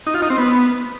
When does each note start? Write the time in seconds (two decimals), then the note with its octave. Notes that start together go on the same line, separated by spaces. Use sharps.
0.07 D#4
0.14 F4
0.22 D#4
0.30 C4
0.38 B3